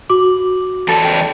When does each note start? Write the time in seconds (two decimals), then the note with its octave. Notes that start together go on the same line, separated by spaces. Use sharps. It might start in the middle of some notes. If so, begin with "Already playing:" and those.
0.09 F#4 D6 F#7
0.88 E2 A4 A5
1.05 G5